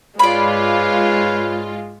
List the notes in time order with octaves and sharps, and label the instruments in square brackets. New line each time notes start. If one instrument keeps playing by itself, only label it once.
[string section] G#2 F4 [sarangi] G#3 [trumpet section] B4 C#5 F5 [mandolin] D5 B5